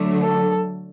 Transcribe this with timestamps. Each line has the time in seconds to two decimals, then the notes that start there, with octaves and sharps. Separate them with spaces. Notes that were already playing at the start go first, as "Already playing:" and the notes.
Already playing: D3 F#3 A3
0.23 A4